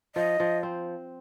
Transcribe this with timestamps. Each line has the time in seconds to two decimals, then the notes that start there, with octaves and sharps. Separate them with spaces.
0.16 F3 D#5
0.40 F3
0.63 C4